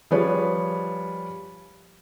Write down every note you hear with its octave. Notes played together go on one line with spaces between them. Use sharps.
F3 G3 G#4 B4 C#5